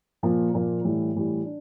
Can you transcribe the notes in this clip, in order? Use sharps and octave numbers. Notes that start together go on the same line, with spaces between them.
A#2 F3 A#3
A#2 F3 A#3
A2 E3 G3
A2 E3 G3
D4